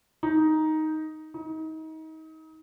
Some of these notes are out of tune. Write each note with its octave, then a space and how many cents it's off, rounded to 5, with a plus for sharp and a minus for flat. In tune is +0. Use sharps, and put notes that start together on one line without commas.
D#4 +5
D#4 +30